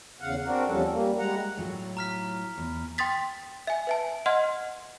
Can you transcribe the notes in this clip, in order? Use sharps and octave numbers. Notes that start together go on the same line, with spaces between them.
E2 C#3 F5 F#5
C4 D4 F#4 A#4
E2 C#3 F3 G3 C#4 A4
G3 A#3
G3 G#3 F#5 A#5
A2 F#3 F4
A#5 F6 B6
E2
G5 C6 D#6 A6 B6
E5 G#5
B4 E5 A5
D#5 F#5 C6 F6 G#6